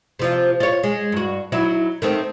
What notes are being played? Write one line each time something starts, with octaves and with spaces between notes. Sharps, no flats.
C3 F3 F4
F4 C#5
G#3
G2 F#4
F#3 D#4 E4
D#3 A3 C4